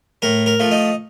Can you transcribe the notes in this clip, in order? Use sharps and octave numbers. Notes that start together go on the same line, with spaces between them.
A2 A#4
A#4
F3 A3
D#4